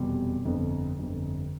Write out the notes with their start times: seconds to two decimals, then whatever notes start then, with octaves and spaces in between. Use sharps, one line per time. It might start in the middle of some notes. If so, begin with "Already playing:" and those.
Already playing: F1 E2 B2 G3 C6
0.45 G1 F2 D3
0.99 G1 F2 D3